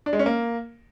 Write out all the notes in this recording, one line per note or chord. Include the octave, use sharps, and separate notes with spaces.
D4
G#3
C#4
A#3